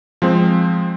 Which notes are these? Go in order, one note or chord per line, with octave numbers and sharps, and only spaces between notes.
F3 G#3 C4